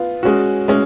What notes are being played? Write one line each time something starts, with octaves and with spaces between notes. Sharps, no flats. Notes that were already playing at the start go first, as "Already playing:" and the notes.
Already playing: B3 F4
G#3 C#4 F#4
G#3 C#4